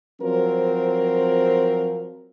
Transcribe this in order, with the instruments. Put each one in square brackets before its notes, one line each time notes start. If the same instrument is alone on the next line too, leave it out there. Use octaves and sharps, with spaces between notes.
[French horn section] F3 F#3 C4 A#4